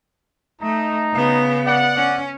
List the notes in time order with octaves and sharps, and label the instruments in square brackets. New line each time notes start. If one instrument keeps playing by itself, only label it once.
[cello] A3 [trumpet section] D#4 A#5
[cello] C#3 B3
[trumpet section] D5 F#5
[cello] C#4